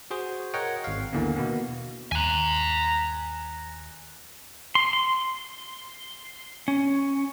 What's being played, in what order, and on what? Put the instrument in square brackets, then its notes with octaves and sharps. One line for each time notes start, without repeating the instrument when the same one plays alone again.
[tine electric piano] F#4 G#4 C5
A#4 C#5 D#5 F#5 G5
G#1 F5
D#2 D3 E3 A#3 B3
B2 A#3 B3
[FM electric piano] D#2 F#6 [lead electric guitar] G#5 A#5
[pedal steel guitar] C6
C6
C#4